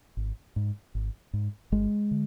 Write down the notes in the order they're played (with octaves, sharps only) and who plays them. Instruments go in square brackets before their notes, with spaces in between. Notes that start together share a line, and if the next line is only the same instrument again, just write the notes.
[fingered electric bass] G#1
G#2
G#1
G#2
G1 G#3
D3